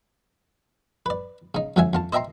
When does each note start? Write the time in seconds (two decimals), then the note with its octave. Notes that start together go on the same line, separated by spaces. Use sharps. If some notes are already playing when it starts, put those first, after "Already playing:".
1.06 B4 D5
1.55 C#3 D#4
1.76 F2 D3 F3 F#3 E5 G#5
1.93 F2 F4 A5
2.13 C5 D#5 E5 G5 A#5 C6